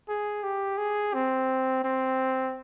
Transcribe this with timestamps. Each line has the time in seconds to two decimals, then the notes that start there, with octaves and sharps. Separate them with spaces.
0.09 G#4
0.44 G4
0.78 G#4
1.14 C4
1.84 C4